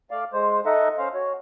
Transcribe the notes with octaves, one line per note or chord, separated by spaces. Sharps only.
A3 D5 F5
G#3 C5
D#4 A4 D#5 E5 F#5
C#4 C5 F5
F#4 C#5